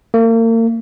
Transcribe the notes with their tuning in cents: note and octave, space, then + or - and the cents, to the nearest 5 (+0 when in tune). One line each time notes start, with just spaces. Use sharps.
A#3 -40